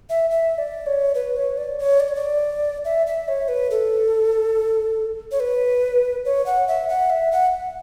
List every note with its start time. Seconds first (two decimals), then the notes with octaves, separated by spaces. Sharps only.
0.10 E5
0.30 E5
0.58 D5
0.86 C#5
1.15 B4
1.37 C#5
1.58 D5
1.79 C#5
2.00 D5
2.08 C#5
2.15 D5
2.85 E5
3.07 E5
3.28 C#5
3.48 B4
3.71 A4
5.32 C#5
5.40 B4
6.25 C#5
6.46 F#5
6.68 E5
6.89 F#5
7.10 E5
7.32 F#5